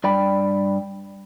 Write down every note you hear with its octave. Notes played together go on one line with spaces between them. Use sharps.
G2 D5 G5 B5